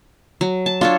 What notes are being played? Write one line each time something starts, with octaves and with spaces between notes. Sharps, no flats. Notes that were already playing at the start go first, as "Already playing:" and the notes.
F#3
A5
D4 F4 A4 C#5